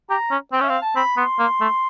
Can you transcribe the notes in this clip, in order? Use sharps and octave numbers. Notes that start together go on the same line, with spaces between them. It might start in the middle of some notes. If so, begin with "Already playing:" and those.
G4 A#5
C#4
C4 G5
C#4 E5
C4 F5
A5
C4 B5
B3 C6
A#3
A3